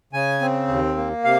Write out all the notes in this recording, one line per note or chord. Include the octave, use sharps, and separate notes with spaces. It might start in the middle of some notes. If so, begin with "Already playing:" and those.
C#3 G#5
C4
D#2
A#3
C3 F5